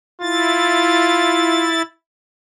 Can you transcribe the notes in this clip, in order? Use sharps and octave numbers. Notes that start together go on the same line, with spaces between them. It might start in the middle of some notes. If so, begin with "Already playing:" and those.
E4 F4 A6